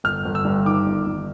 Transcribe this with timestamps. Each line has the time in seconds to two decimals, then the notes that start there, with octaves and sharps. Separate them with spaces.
0.04 G1 F6
0.25 G1
0.35 E6
0.45 G2
0.66 D#3 D6
0.87 G1
1.07 G1